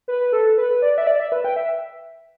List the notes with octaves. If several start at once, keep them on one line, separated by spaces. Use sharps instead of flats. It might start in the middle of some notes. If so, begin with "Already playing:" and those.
B4
A4
B4
D5
E5
D5
E5
B4
G5
E5